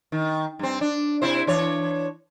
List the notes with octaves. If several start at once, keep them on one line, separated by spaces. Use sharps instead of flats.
D#3
G2 C4
D4
C3 E4 C5
E3 D4 C#5